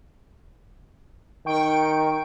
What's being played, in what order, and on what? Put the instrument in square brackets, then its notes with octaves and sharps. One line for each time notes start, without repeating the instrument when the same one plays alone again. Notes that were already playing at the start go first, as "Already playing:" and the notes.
[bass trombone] D#3 [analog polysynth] G5 C#6 D7